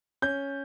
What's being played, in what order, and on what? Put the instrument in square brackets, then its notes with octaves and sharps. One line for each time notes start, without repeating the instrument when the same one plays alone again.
[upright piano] C#4 G6